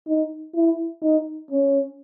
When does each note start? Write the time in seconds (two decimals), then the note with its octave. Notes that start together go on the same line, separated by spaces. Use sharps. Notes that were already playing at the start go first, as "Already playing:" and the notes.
0.09 D#4
0.56 E4
1.03 D#4
1.51 C#4